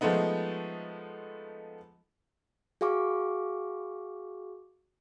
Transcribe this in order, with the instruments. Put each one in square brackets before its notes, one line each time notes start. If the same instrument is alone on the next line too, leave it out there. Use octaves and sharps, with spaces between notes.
[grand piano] F3 G#3 A3 B3 D#4
[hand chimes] F#4 G#4 F5 C#6 D6